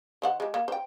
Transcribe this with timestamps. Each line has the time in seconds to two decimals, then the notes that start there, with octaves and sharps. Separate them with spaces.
0.22 D#3 C5 F#5
0.40 G#3 G4
0.54 A#3
0.68 C5 G5